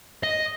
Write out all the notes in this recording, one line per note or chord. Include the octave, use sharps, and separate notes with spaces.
D#5